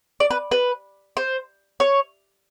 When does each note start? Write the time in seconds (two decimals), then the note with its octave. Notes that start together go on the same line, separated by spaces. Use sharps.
0.20 D5
0.31 B4
0.51 B4
1.17 C5
1.80 C#5